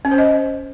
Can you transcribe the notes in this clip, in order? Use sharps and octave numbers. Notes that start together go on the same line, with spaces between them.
C#4
C5
D#5